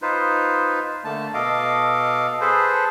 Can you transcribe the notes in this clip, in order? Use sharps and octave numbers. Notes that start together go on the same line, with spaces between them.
D#4 F4 B4 C5
D3 A3 A#3 A5
B2 A4 D#5 F5 D6
G#4 A4 B4 C5